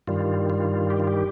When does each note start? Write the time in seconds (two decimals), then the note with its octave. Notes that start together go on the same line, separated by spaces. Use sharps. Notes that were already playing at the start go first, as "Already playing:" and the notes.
0.08 G2 D#3 G3 F4
0.50 F4
0.90 G4
1.00 F4
1.07 G4